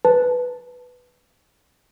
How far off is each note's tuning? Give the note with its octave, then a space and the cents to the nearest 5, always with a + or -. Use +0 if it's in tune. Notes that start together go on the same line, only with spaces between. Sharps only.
B4 +0 A5 +0